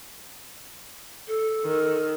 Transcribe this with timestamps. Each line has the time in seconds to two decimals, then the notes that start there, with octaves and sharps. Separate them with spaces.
1.28 A4
1.65 D#3